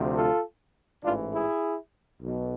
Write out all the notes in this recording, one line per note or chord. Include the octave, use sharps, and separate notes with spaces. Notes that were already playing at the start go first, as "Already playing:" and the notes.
Already playing: D2 C3 F3
F4 A4
A1 G#2 E3 D4 F4
E4 G#4
B1 B2